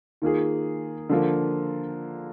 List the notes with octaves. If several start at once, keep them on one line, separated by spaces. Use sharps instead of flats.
D#3 A#3 F4 G#4
D3 F3 A#3 F4